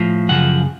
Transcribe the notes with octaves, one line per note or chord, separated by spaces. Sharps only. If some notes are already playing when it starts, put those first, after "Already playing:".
Already playing: A2 F3
F#2 C#3 F3 F#5